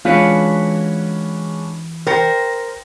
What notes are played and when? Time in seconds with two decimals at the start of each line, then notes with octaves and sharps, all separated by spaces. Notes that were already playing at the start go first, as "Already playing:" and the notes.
0.05 E3 G#3 C#4 D4 F4 F#4 B4
2.07 A#4 C5 G5 A#6 C#7